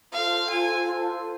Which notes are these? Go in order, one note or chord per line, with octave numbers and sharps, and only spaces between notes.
F4 A4 C5 F5
G#5